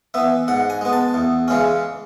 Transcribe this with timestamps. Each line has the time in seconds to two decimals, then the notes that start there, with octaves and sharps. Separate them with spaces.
0.14 E3 B3 E5
0.48 G#2 F#5
0.70 G#5
0.81 G#3 B3
0.93 A5
1.14 E2
1.48 C#3 E3 G#3 C#4